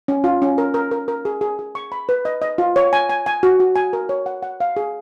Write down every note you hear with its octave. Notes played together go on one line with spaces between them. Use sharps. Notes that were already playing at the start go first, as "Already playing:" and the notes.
C#4
F4
C#4
A#4
A#4
A#4
A#4
G#4
G#4
G#4
C#6
B5
B4
D#5
D#5
F4
C#5
G#5
G#5
G#5
F#4
F#4
G#5
A#4
C#5
F#5
F#5
F5
G#4